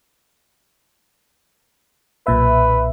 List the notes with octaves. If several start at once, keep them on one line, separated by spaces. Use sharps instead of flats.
B1 A#2 B4 E5